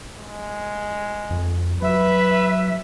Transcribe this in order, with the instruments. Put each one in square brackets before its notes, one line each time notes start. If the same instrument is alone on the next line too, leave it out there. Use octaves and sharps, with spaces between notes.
[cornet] G#3
[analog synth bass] F2
[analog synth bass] F#3 [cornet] B4 [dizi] E5